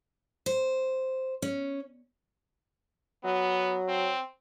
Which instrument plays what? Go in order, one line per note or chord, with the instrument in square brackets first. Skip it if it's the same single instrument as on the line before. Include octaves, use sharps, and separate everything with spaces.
[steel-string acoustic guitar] C5
C#4
[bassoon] F#3 [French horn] B3
[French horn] C4